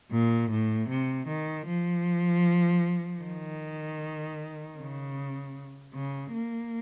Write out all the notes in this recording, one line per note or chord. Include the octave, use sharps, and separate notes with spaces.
A#2
A2
C3
D#3
F3
D#3
C#3
C#3
A#3